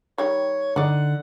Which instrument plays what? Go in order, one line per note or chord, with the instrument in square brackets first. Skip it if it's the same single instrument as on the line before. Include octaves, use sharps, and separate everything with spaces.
[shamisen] D#3 G3 [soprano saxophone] C#5
[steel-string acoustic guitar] D3 [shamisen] D#4 D5 [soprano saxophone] F#5